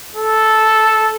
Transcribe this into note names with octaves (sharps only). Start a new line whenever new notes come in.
A4